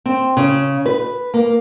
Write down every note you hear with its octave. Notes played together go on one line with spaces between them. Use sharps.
C4
C#3
B4
A#3